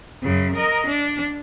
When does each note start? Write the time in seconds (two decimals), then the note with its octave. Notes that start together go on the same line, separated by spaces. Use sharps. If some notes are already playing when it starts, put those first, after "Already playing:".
0.23 F#2 C#3
0.55 A#4 D#5
0.87 D4